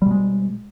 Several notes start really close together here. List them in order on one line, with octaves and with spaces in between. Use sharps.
G3 B2 G#3